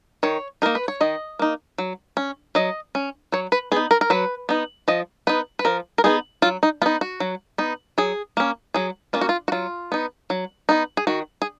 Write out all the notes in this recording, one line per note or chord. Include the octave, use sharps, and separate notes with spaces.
D#3 C#5
A#3 D#4 A#4
B4
C#5
D#3 D#5
A#3 D#4
F#3
C#4
F#3 D#5
C#4
F#3 C#5
B4
B3 D#4 G#4
A#4
A#4
F#3 B4
B3 D#4
F3 D#5
B3 D#4 B4
B4
F3 A#4
A#4
B3 D#4 G#4
F#3 F4
D#4
B3 D#4 F4
F#4
F#3
B3 D#4
F#3 G#4
A#3 C#4
F#3 G#4
A#3 C#4 F4
F#4
F4
F#4
F#3 F4
B3 D#4
F#3
B3 D#4
G#4
D#3 F#4
G#4